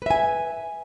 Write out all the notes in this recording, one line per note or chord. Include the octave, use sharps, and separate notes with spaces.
B4 E5 G#5